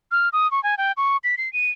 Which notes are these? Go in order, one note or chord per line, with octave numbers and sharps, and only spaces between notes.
F6
D#6
C#6
G#5
G5
C#6
B6
C7
D#7